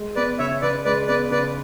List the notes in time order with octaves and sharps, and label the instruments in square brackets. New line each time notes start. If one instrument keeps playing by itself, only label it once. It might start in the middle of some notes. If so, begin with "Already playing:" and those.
Already playing: [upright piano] G#3
[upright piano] B3 [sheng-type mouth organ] B4 D5
[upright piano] C#3 [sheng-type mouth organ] C#5 E5
[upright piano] C#3 [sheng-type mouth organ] B4 D5
[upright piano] G#3 [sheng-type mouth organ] B4 D5
[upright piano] B3 [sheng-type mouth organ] B4 D5
[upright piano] C#3 [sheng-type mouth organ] B4 D5